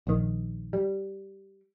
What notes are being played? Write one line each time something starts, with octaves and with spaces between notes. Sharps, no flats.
A#1 D#3
G3